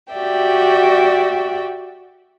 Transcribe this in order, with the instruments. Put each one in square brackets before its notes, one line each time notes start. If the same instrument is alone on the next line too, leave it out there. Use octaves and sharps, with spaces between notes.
[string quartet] F#4 G4 D5 E5 G5